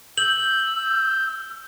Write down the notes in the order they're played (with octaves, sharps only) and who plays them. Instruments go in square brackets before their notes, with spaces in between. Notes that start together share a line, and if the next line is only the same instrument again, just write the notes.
[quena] E6 [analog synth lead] G6 [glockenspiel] F#7